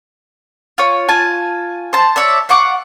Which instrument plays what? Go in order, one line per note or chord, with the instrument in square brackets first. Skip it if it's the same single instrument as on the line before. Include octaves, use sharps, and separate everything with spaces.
[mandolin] F4 C#5
F4 G#5 A5
C5 A5
C#5 D5 E5
F5 F#5 C#6 D6